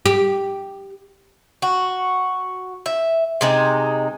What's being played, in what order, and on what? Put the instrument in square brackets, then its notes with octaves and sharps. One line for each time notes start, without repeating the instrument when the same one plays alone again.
[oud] G4
[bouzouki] F#4
E5
C3 G#3 D#4